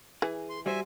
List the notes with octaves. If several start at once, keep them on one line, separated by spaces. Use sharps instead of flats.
E3 G#4
C6
G3 F#4 C5 E5 G#5